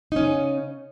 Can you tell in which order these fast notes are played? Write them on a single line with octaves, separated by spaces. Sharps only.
D#4 C#4 C#3